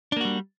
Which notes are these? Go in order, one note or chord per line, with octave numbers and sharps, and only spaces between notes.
G3 A#3 D4 F#4